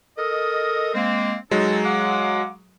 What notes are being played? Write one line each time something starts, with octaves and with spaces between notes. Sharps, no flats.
A4 A#4 D#5
G#3 A#3 C4
F#3 G#3 D#4 A4
F5 F#5 D6